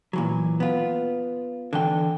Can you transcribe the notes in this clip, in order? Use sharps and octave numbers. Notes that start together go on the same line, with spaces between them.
A#2 E3 F#3
B3 F4
D3 E3 G5